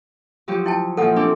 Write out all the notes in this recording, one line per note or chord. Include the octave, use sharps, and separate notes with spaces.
F3 F#3 G4
E4 G5 A5
F#2 A#2 F3 A4 F#5
C4 D4 A4 D6